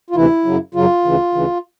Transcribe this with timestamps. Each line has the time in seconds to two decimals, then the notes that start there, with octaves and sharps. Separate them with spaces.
0.10 F4
0.16 D2 C3 E3 E4
0.45 F#2 C#3 F#3
0.75 F#2 C#3 F#3 F4
1.05 D2 C#3 E3
1.34 D2 C#3 E3